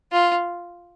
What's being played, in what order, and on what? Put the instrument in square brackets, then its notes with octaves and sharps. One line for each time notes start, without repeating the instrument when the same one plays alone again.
[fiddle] F4